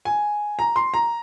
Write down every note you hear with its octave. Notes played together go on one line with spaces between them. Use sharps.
G#5
A#5
C6
A#5